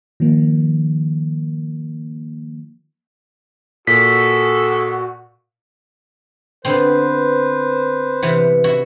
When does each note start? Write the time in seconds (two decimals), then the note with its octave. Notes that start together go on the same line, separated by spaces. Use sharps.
0.20 D#3 F3 A#3
3.87 A#2 F#4 G#4 A4 B6
6.65 D3 B3 C4 B4 C5
8.22 C3 E3 B3
8.64 E4 F#4